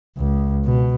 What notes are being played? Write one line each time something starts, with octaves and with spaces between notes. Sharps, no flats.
C#2
B2